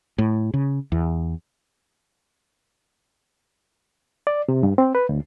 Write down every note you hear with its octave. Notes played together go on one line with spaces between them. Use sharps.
A2
C#3
E2
D5
C3
G2
C4
B4
D2